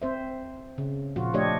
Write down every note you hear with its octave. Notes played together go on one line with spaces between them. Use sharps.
C4 C5 E5
C#3
A#2 F3 F4 F#4
F3 A3 D4 G4 C#5 D#5